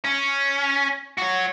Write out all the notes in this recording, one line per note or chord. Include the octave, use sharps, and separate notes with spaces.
C#4
F#4 C#5